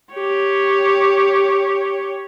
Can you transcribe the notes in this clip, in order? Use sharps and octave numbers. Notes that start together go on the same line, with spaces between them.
G4 C#5